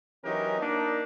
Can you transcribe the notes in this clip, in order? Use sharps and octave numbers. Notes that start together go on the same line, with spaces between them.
E3 F#3 C#4 D#4 G4 A#4
A#3 D4 D#4